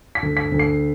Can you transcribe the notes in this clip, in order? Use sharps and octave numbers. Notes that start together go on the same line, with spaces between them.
B6
D2
B6
D2
C7